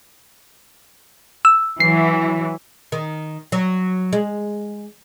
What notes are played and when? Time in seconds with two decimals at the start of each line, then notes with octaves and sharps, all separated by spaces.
1.45 E6
1.80 E3 F#3 C7
2.92 D#3
3.52 F#3
4.13 G#3